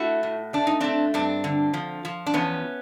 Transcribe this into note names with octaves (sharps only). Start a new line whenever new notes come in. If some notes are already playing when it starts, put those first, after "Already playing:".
Already playing: A3 E4 F#4
A2
A3 D4
D#4
A3 C4 D4
G2 C4 D4
D3
F3
F3
D4
E2 B3 C#4